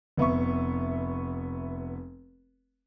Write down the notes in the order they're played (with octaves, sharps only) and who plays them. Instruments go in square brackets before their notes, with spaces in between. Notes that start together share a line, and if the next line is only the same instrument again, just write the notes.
[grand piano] F1 B3 E5 C#6